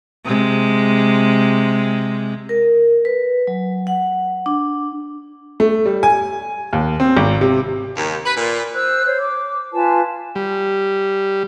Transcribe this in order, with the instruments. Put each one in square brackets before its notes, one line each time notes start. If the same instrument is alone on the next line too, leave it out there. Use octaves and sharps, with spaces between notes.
[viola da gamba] C3 G#3
[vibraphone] A#4
B4
F#3
F#5
D4
[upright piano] A3
G3
G#5
D#2
C4
G#1
C3
[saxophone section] D#2
B4
A#2
[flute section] C5 E6 F#6
C5 C#5
D6
F4 B4 G#5 A5
[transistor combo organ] G3